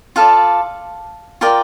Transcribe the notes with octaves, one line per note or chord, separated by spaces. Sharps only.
F4 A4 D5 F5
F4 A#4 D5 G5